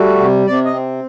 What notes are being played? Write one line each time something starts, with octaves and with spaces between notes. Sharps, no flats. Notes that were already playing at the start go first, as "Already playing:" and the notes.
Already playing: G3 A3 F#4
C3
C3 D5
D#5
C4